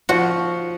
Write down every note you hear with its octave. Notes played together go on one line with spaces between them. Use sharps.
F3 F#4